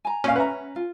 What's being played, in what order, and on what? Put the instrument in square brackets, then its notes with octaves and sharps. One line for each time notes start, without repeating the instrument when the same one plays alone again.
[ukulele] G#5 A#5
[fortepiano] A#2 F5 [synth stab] C#4 [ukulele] C5
[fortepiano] B4 A#5 [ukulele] E5 F#5
[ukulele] F4